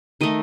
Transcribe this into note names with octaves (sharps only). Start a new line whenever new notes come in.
D#3 A3 D#5